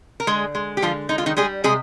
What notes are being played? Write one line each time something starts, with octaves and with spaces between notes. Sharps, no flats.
A#4
D3 G#3 G#4
G#3
G4
D3 F3 F4
G#3 D#4
F4
D#3 D#4
G3 G#3 G#4
C3 G#3 G#4